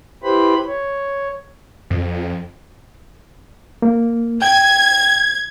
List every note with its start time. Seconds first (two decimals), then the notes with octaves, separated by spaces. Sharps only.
0.24 E4 G4 B4 C5 B5
0.67 C#5
1.90 F2
3.82 A#3
4.42 G5 G#6